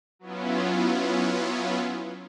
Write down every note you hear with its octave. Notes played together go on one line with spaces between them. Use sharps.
F#3 B3 C#4 E4 F4